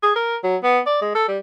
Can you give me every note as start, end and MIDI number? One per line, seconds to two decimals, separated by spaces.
0.03 0.12 68
0.16 0.36 70
0.43 0.56 54
0.63 0.79 59
0.86 0.97 74
1.01 1.14 56
1.15 1.24 69
1.28 1.38 55